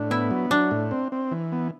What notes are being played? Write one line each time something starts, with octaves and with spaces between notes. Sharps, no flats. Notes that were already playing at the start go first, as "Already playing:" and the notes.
Already playing: A2 D4
B3 E4
F#3
F#3 D4
A2
C4
C4
E3
B3